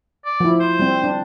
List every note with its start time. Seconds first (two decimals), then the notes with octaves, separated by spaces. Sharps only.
0.25 D5
0.40 F3 E4
0.59 C5
0.79 G3 C4
1.04 D4